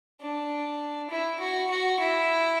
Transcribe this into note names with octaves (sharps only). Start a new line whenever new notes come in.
D4
E4
F#4
F#4
E4